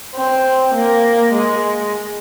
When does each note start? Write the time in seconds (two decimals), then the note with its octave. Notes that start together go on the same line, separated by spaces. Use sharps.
0.15 C4
0.74 A#3
1.33 G#3